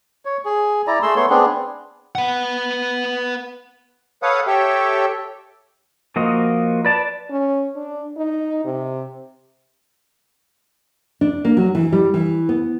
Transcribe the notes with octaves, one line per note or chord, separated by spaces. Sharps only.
C#5
G#4
E4 D5 A#5
A3 G#4 C6 E6
A3 B3 C#5 C6
B3 C4 D4 G#4
B4 F#5
A4 B4 C#5 F5 F#5 D#6
G4 A4 C#5 E5 G5
F3 A#3 F#4 D#5
B4 D5 A5
C#4
D4
D#4
C3
D4
A#3
F#3
E3
G3
E3
B3